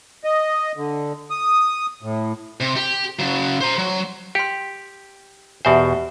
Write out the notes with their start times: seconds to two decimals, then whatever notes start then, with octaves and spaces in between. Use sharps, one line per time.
0.24 D#5
0.77 D3
1.30 D#6
2.03 A2
2.60 C3
2.76 G4
3.19 C#3 F#3
3.61 C5 A#5
3.78 F#3
4.35 G4 G5 C6
5.65 E2 B2 G4 C5 E5 G#5